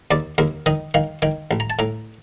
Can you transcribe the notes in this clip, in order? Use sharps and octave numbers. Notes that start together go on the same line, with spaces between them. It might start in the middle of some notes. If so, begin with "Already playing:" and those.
D#2 D5
D#2 A#4
D#3 D#5
D#3 F5
D#3 G5
A1
A#5
A5
A2 A#5